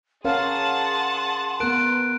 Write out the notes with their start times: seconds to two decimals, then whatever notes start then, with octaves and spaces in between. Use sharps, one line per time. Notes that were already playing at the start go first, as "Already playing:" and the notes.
0.25 C#4 G#4 A#4 F5 F#5 A5 C6
1.60 B3 A#4 F#6 D7